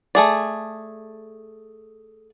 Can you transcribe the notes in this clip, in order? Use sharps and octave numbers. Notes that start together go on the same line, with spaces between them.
A3 G#4 D5